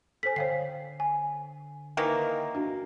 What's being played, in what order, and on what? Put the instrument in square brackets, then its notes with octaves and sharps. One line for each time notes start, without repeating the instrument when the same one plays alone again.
[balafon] A4 G#5 [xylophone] C5 B6
[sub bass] D3 [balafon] C#5 F5 G5 [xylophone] C7
[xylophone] G#5
[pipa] D#3 E3 A#3
[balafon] D4 F#4